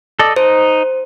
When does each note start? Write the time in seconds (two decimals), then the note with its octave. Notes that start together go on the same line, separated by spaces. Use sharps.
0.19 A4 D5 D#5
0.36 D#4 C5